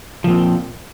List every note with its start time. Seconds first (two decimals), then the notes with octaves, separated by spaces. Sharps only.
0.24 F3
0.27 A#2
0.30 C4